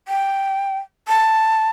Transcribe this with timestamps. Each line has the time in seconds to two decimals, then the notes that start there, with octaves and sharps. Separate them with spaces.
0.08 G5
1.08 A5